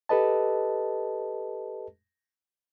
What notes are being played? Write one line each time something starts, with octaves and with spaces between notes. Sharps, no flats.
G4 A4 B4 D#5 A5